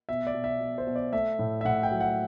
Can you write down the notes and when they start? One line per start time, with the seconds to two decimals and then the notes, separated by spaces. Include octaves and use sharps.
0.09 B2 E5
0.27 D5
0.34 B2
0.44 E5
0.60 B2
0.78 C5
0.87 B2
0.96 D5
1.13 A3 E5
1.39 A2
1.61 E5
1.65 A2 F#5
1.83 G5
1.91 F#3
2.01 F#5